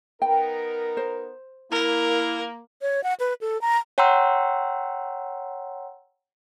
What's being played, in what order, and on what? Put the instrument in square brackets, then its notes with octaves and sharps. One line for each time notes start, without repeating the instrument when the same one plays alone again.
[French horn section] B3 D#4 A#4 [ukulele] G5
[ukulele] C5
[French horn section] A#3 [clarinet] E4 [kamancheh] A#4
[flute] C#5
F#5
B4
A4
A#5
[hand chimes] C#5 F#5 G5 A#5 C6 E6